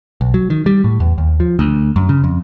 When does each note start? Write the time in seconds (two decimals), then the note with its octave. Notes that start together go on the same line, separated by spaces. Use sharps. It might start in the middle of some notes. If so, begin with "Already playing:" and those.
0.21 B1
0.34 F#3
0.50 D#3
0.66 G3
0.84 A2
1.00 E2
1.18 D#2
1.40 F3
1.59 D2
1.96 F#2
2.09 C#3
2.24 F2